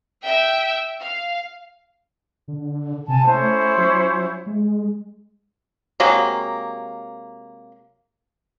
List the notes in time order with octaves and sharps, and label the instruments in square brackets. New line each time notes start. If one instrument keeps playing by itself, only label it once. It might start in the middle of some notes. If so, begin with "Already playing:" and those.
[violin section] E5 G5
F5
[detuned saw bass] D3
[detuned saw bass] C3 [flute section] G#5 A5
[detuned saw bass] A3 [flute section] C#4 E4 C5
[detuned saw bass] F#3
G#3
[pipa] C3 F#3 G#3 A#3